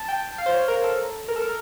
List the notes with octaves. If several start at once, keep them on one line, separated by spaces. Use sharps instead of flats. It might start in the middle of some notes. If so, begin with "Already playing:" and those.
Already playing: A5
G5
F5
C5
C#5
A#4
A4
A#4
A4
A#4